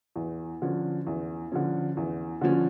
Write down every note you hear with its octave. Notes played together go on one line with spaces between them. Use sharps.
E2
D3 F3 C#4
E2
D3 F3 C#4
E2
D3 F3 C#4